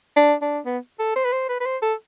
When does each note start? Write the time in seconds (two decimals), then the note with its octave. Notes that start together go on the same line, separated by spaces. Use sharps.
0.16 D4
0.42 D4
0.66 B3
1.00 A4
1.16 C5
1.25 B4
1.32 C5
1.49 B4
1.60 B4
1.65 C5
1.82 A4